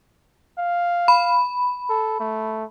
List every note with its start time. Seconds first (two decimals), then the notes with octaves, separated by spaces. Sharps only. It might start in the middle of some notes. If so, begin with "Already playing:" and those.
0.59 F5
1.08 B5
1.90 A4
2.20 A3